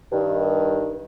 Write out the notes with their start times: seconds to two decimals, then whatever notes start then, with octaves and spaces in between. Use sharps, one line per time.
0.12 G2 D#3